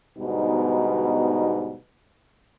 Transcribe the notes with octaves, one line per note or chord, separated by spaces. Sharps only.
D2 G#2 B2 G3 B3 D#4